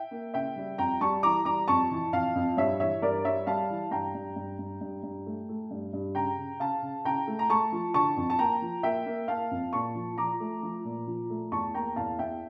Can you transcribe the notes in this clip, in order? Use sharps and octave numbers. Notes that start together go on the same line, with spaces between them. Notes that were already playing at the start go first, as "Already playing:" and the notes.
Already playing: E5 G5
A#3
C#3 E5 G5
G3
F2 G5 A#5
G3 A5 C#6
E3 A#5 D6
G3 A#5 D6
F2 A5 C#6
E3
F2 F5 A5
F2
G2 C#5 E5
E3 C#5 E5
G2 A#4 D5
G3 C#5 E5
G3 F5 A5
E3
G2 G5 A#5
G2
G2
G2
G2
G2
A3
A3
G2
G2
C#3 G5 A#5
C#3
C#3 F5 A5
C#3
C#3 G5 A#5
A3
A#5
A3 A5 C#6
F3
D3 A5 C#6
F2
A5
A#3 G5 A#5
F3
A#3 E5 G5
A#3
A#3 F5 A5
F2
A#2 A5 C#6
F3
F3 A#5 D6
A3
F3
A#2
F3
A3
E2 A5 C#6
A#3 G5 A#5
E2 F5 A5
E2 E5 G5